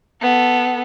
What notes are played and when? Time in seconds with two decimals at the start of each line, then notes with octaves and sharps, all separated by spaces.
0.22 B3 A4